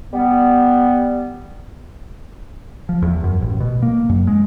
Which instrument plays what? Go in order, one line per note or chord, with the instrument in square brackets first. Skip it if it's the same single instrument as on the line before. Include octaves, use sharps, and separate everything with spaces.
[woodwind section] G3 B3
[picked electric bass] F3
E2
F#2
A1
B2
A#3
F#2
G#3